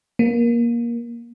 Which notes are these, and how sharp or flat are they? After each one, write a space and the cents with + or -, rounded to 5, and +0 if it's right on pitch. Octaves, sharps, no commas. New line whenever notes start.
A#3 +20